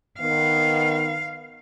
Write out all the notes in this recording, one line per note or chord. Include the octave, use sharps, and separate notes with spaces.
D#3 B3 F5